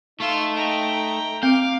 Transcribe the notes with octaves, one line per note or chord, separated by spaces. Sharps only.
A3 D#4 F4 E6
G5 A#5
C4 F5 D6